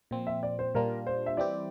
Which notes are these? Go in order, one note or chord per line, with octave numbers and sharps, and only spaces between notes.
A#2 F3 C4
E5
D5
C5
A#2 G3 D4 F4 A#4
C5
E5
E3 G3 C4 E4 G4 D5